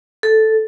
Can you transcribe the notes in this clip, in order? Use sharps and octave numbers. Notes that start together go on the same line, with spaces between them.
A4